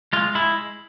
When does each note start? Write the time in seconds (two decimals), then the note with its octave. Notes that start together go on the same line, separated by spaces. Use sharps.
0.13 G#3 F4
0.35 G#3 E4